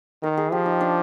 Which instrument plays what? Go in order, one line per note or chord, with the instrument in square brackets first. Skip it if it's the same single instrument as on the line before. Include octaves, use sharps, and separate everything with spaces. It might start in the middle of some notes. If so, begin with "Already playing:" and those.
[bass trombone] D#3 [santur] A#4
[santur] G#4
[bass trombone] F3 [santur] G4
[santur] D#4
D4